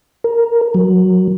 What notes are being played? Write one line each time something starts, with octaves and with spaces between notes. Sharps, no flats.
A#4
F#3